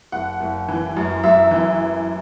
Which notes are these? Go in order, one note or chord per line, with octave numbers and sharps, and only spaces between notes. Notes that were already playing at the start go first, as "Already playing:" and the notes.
F#1 F#5
F#1
E3
F#2
F#2 E5
E3